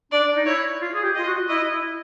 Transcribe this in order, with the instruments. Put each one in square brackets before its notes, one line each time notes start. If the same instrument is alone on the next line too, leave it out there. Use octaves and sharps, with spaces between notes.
[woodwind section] D4 [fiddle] D5
[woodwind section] D#4
[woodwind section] E4 [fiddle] C#5
[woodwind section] F4
G#4
G4
[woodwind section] F4 [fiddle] D#5
[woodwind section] F#4
[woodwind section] E4 [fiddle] D#5
[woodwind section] E4